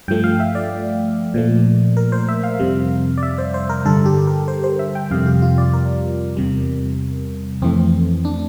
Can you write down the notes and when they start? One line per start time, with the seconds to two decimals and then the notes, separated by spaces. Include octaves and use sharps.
0.08 G2 F3 A3 G5
0.24 F5
0.40 E5
0.55 D5
1.34 A#2 F3 A3
1.97 A#4
2.12 C5
2.29 E5
2.43 F5
2.59 F2 C3 G3
3.18 D5
3.23 E5
3.38 C5
3.54 C5
3.69 A#4
3.85 G2 D3 G3 A4
4.06 G4
4.27 A#4
4.48 C5
4.64 C5
4.79 E5
4.95 G5
5.11 F2 C3 G3 F5
5.26 G4
5.42 F4
5.58 D5
5.74 A#4
6.37 E2 C3 G3
7.62 F2 E3 A3 C4
7.79 C4
8.25 D4